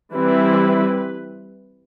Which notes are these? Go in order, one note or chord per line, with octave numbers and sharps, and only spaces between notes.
E3 G3 C4 E4 B4